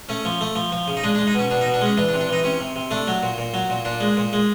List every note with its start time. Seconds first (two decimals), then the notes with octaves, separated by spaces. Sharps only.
0.09 A3 C#4
0.25 F3
0.41 A3
0.56 F3
0.72 F3
0.88 C#3
0.97 D#4
1.04 G#3 D4
1.15 D4
1.19 G#3
1.27 D#4
1.34 B2 C#4
1.50 B2 D4
1.61 D#4
1.66 B2
1.74 D4
1.81 G#3 C#4
1.97 E3 D4
2.09 D4
2.13 C3
2.21 D4
2.29 E3 D#4
2.44 C3 C#4
2.60 C3
2.76 C3
2.91 A3 D4
3.08 F#3
3.23 A#2
3.38 A#2
3.54 F#3
3.70 A#2
3.85 A#2 D4
4.01 G#3
4.17 A#2
4.33 G#3